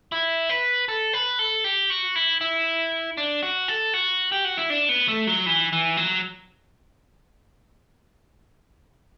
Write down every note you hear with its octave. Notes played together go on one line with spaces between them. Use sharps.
E4
B4
A4
B4
A4
G4
F#4
E4
E4
D4
F#4
A4
F#4
G4
F#4
E4
D4
B3
A3
F#3
E3
E3
F#3